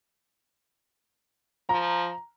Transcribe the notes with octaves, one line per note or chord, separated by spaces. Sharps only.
F3 A#5